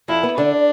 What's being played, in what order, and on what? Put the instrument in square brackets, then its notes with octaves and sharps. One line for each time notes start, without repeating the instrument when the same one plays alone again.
[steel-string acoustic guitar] F2 [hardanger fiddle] E4
[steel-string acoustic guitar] B3
[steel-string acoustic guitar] D3 [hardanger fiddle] D4